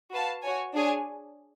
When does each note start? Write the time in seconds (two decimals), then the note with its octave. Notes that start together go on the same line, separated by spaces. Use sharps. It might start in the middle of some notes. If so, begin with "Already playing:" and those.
0.11 F#4 B4 F5 A5
0.43 F#4 C#5 G#5
0.74 D4 G#4 C#5 G#5